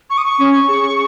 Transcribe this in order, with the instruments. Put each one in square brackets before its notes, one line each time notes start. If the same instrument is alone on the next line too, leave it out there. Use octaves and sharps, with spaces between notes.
[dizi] C#6
D#6
C#6
[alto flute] C#4
G#4